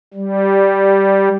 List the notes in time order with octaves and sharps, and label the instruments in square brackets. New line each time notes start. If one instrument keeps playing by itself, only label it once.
[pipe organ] G3